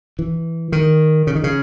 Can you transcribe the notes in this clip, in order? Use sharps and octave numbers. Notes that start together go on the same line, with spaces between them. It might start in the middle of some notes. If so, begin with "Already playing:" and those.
E3
D#3
C#3
D#3
C#3